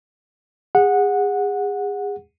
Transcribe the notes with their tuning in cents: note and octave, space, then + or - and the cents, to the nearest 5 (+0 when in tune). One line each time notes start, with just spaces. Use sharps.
G#4 -30 F#5 -15